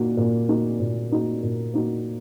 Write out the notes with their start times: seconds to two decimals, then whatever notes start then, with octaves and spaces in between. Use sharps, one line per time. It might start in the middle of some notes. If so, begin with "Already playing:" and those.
Already playing: A#2 A#3 D#4 F#4
0.17 A#2
0.48 A#3 D#4 F#4
0.80 A#2
1.11 A#3 D#4 F#4
1.43 A#2
1.74 A#3 D#4 F#4